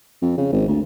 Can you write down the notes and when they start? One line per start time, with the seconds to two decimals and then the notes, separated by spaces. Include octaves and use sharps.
0.22 F2
0.38 C#3
0.52 G#1
0.68 D2